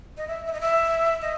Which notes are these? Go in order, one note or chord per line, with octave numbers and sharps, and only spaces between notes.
D#5
E5
E5
D#5
E5
D#5